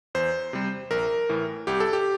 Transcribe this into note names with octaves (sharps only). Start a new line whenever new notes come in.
E2 C5
C3 G3
A#1 A#4
A2 E3
C2 G4
A4
G4